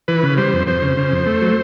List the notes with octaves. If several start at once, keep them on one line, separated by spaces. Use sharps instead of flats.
E3 B4
C#3
G3 C5
F2
F2 C5
C#3
C#3
F2
A3
F#3